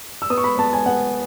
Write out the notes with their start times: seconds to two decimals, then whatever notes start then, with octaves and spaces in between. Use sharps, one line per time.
0.22 E6
0.30 B3 D#6
0.38 C#6
0.44 B5
0.58 B3 A5
0.73 G#5
0.86 B3 F#5